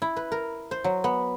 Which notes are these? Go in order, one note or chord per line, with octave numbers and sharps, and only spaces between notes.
E4
B4
A#4
C5
F#3
B3